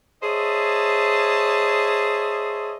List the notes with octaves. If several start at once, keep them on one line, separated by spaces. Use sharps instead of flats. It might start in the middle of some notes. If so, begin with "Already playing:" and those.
G#4 C5 C#5 D#5 E5 A5